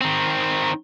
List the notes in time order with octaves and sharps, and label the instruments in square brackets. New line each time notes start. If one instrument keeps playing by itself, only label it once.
[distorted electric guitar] D#3 C4